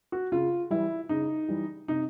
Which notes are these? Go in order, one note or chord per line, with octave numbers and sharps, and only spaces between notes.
F#4
C#3 F4
E3 G3 E4
C#3 D#4
E3 G3
C3 D#4